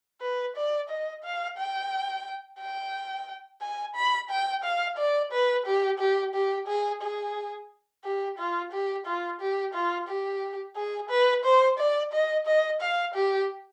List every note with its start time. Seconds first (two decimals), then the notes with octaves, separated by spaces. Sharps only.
0.21 B4
0.56 D5
0.89 D#5
1.24 F5
1.57 G5
2.59 G5
3.61 G#5
3.95 B5
4.30 G5
4.64 F5
4.97 D5
5.32 B4
5.66 G4
5.99 G4
6.34 G4
6.68 G#4
7.01 G#4
8.04 G4
8.38 F4
8.72 G4
9.06 F4
9.41 G4
9.74 F4
10.08 G4
10.76 G#4
11.10 B4
11.44 C5
11.78 D5
12.12 D#5
12.46 D#5
12.81 F5
13.14 G4